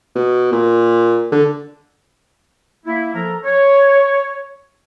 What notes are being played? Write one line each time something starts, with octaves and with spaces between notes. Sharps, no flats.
B2
A#2
D3
A#3 E4
F3 A4 A#4 A#5
C#5